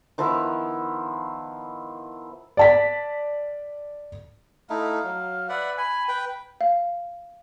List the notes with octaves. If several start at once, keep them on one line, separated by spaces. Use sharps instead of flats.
D#3 F3 B3 E4
D5 A5 B6
A3 D#4 E4 F5
F#3
B4 D5 E5 F#5
G#5 B5
B4 G5
F5